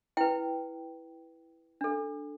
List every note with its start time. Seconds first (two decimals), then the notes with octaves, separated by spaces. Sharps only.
0.17 E4 B4 G5
1.81 D4 A4